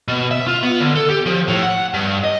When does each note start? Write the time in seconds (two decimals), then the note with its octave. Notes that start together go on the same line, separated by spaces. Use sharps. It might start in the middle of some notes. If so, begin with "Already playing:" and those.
0.08 B2
0.31 E5
0.47 F4
0.63 B3
0.81 D3
0.95 A4
1.09 G4
1.26 F3
1.48 A2
1.63 F#5
1.94 G2
2.24 D#5